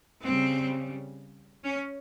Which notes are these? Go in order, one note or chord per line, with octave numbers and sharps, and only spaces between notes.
C#3 G3 C4
C#4